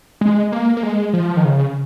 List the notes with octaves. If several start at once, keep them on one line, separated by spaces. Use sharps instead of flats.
G#3
A#3
A#3
G#3
F3
D#3
C#3